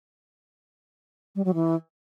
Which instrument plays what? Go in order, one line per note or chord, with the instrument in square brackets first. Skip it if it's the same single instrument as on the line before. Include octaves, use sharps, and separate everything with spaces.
[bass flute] G3
F#3
E3